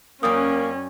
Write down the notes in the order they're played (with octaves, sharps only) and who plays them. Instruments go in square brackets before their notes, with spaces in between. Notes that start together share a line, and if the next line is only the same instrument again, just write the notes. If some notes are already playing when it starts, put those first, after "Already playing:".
[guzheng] F#2 D5 G5 [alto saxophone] A#3 [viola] C#4 [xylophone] D#6